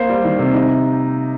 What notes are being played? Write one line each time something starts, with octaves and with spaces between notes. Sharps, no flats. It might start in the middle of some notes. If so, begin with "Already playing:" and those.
Already playing: A#3 C5
G3
D#3
C3
D#4